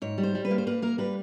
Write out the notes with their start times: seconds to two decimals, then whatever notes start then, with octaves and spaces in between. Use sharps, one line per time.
0.02 G#2 C#5
0.18 G3
0.23 C5
0.35 G3
0.45 B4
0.51 A#3
0.58 C5
0.67 A#3 B4
0.82 A#3 A#4
0.98 G3 B4